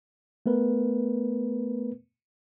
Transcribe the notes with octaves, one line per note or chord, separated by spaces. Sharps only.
A3 B3 A#4 B4